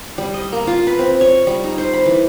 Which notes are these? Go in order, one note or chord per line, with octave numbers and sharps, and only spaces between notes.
G3
D#5
A#3
F4
B4
C4
C#5
G3
D#4
C5
B5
E3